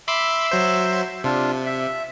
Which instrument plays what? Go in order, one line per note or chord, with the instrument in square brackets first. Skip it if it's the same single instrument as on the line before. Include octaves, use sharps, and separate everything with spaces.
[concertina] E5 E6 [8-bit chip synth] B5 C6 D6
[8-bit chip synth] F#3 C5
[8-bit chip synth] C3 [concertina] D4 F4
[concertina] E5